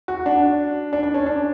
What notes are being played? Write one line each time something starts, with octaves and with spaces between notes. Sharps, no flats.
F#4
D4
D4
D4
C#4
D4